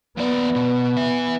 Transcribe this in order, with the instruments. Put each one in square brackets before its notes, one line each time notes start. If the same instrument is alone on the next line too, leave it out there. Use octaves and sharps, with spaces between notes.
[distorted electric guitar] D#2 D5 [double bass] B3
[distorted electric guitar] B2
B4 E5